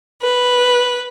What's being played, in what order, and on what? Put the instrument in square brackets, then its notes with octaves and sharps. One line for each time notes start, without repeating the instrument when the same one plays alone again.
[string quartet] B4